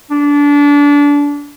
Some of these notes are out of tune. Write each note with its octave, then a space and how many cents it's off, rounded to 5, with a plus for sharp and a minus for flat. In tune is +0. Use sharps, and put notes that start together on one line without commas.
D4 -25